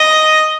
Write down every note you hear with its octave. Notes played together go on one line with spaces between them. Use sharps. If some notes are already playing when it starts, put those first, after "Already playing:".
Already playing: D#5